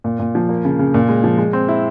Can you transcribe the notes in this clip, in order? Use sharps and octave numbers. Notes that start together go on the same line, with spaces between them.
A#2
A#2
F3
A#3
C#3
C#3
A#2
G#3
F3
G#3
C4
E4